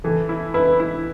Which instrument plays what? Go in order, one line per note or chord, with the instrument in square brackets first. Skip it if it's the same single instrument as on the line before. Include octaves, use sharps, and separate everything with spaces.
[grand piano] E3 [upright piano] A4
[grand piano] E4
[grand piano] E4 [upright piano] B4
[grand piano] E4